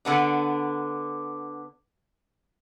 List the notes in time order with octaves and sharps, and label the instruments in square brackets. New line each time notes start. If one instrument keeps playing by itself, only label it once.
[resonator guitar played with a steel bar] D3 B3 D4